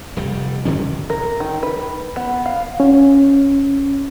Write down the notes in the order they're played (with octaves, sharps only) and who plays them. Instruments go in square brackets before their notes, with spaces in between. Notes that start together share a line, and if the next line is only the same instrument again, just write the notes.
[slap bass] F1 G3
B2 D3 G3 C#4
[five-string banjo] A#4
D#3
B4
B3
F5
[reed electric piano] C#4